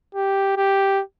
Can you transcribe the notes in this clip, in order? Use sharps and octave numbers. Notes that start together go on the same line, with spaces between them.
G4
G4